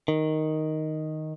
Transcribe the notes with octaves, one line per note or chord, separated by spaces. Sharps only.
D#3